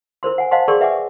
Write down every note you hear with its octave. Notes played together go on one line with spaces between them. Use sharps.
E4 A#4 C5 C6
F#5 G#5
C5 D#5 F5 F#5 A5 C6
G#4 A#4 D5 G5 C6 C#6
B4 E5 F#5 G#5 D6